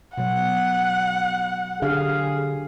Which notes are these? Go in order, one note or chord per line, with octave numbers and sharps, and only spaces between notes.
B2 F#3 F#5
D3 G4 G#4 F5